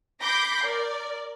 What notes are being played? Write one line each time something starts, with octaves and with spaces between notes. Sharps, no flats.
B5 D6 G6 A#6 C7
A#4 D5